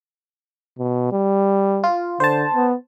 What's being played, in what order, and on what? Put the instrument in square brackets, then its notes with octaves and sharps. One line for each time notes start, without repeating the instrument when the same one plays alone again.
[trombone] B2
G3
[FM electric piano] F4
[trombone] D3 [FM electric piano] C5 A5
[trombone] B3